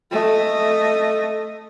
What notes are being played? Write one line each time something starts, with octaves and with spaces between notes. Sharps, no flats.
A3 D#5